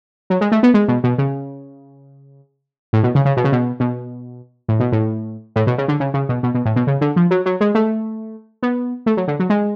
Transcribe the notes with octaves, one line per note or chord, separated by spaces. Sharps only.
F#3
G#3
A3
B3
G#3
B2
B2
C#3
A2
B2
C#3
C#3
B2
C#3
B2
B2
A2
B2
A2
A2
B2
C#3
D3
C#3
C#3
B2
B2
B2
A2
B2
C#3
D3
F3
F#3
F#3
G#3
A3
B3
A3
F#3
D3
F#3
G#3